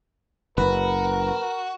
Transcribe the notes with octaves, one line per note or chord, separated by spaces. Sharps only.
F#1 F#4 A#4 B4